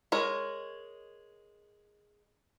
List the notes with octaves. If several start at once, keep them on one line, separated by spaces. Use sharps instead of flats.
G#3 A#4 C#5